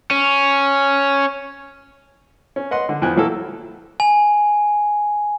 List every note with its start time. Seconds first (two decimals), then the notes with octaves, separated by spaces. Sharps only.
0.11 C#4
2.56 C#4
2.71 B4 D#5 F#5 C6
2.89 D3
3.02 E2 F3 G5 G#5 F#6
3.16 A#2 E3 F#3 A#3 E4 A4
4.00 G#5